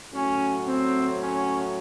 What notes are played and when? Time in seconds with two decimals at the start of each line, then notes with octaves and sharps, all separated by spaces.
0.13 A2 F#3 C#4
0.67 C4
1.20 C#4